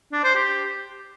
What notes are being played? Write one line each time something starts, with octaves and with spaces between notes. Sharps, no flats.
D4
C5
G4